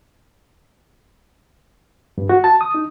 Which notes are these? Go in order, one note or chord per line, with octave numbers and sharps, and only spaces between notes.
G2
F#4
A5
D#6
D#4